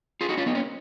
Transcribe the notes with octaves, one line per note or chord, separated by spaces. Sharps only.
F4 G#4
D#4 F#4
C#4 F4
B3 D#4
A#3 C#4